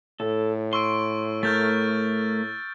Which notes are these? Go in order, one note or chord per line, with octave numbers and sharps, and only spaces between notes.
A2 A4
C6 C#6 E6 D7
A3 A#4 F6 G6 A6